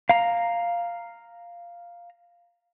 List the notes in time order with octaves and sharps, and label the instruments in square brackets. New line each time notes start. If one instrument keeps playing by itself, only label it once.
[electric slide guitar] F5 A#5